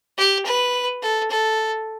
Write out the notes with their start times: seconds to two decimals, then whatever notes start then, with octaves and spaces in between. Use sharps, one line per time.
0.18 G4
0.46 B4
1.02 A4
1.30 A4